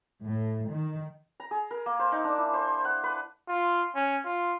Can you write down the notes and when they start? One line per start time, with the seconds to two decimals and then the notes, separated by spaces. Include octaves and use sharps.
0.25 A2
0.71 D#3
1.40 A#5
1.51 G#4
1.71 A#4
1.86 A#3
1.99 C5
2.12 D#4
2.24 D4
2.38 E4
2.53 C5
2.85 F#5
3.04 B4
3.49 F4
3.95 C#4
4.25 F4